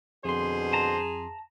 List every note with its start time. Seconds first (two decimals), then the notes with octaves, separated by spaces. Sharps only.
0.25 F2 B2 D3 G#4 C5 C6
0.73 A5 A#5